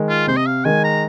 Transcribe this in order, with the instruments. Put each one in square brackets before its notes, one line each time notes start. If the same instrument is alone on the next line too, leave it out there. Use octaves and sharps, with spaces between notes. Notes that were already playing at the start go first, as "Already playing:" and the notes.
Already playing: [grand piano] D#3 G#3
[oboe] F4
[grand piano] C3 [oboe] C5
[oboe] D#5
F5
[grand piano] D#3 G#3 [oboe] G#5
[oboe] A#5